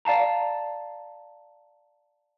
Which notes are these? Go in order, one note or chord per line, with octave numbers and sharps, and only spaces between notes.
D5 F5 A5 A#5